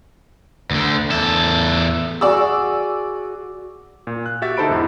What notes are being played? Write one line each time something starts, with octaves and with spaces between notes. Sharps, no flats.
D2 D3
E2 A4
F#4 G#4 D5 E6
A#2
F#6
F#4 G4 E5 A6
D3 D#4 A4 C5 B5 D7
E2 G#2 E4